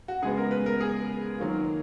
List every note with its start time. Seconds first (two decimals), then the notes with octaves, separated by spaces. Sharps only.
0.08 F#4
0.22 C#3 G#3 B3 G#4
0.38 A#4
0.51 B4
0.66 A#4
0.81 G#4
1.38 D#3 F#3 A#3 F4